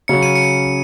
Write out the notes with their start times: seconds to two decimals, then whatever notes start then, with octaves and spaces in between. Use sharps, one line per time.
0.08 C#3 F#3 C#4 C#7
0.23 D#7
0.35 C#7